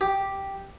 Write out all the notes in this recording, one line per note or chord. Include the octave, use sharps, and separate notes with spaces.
G4